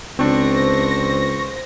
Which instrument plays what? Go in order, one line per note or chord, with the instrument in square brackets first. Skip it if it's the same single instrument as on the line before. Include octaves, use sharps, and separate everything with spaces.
[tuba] C#2 [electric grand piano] C4 D4 [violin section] C5 A#6 [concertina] C#6